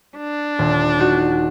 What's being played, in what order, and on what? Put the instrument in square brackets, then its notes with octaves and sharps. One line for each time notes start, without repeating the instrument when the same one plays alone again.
[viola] D4
[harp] D#1
D#4 F#4